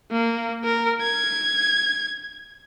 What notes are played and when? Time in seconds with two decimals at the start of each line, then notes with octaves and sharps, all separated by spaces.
0.11 A#3
0.65 A#4
1.02 G#6